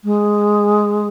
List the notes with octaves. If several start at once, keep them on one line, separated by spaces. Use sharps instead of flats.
G#3